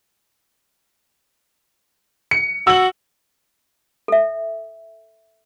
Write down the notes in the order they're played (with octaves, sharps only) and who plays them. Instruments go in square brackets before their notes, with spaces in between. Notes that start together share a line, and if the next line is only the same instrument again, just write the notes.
[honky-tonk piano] C#7
[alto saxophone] F#4 [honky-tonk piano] E6 F#7
[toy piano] A4 E5